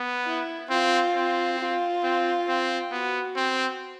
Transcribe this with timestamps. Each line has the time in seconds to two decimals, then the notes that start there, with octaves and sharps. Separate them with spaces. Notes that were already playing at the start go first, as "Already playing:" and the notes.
Already playing: B3
0.25 E4
0.70 C4 F4
1.15 C4
1.59 F4
2.03 C4
2.48 C4
2.92 B3 F#4
3.36 C4